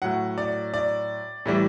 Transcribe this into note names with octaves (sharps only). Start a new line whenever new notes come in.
A2 F#3 F#5
D5
D5
A2 E3 G3